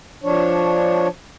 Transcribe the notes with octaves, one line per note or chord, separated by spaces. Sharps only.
F3 D4 C#5